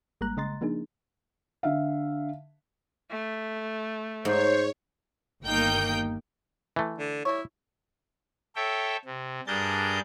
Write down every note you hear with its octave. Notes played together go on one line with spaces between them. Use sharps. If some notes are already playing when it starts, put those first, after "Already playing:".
G#1 G3 G#3 A#3 A#5 F#6
C#3 G#3 D#5 A#5 C6 A6
F3 A#3 D4 D#4 G#4
D3 E5 F5
A3
G#2 C5 C#5
G1 D#2 A#3 D#4 G5 G6
E3 A3
D3
G3 E4 C#5
A4 C#5 E5 G5
C3
G2 D4 G#4 A#4 G6 A6